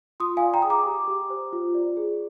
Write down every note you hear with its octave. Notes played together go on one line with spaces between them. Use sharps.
F4 C6 D#6
D5 F5 G#5
G5 A#5
G#4 D#6
A#5 D6
G4
G4
C5
F4
D5
G#4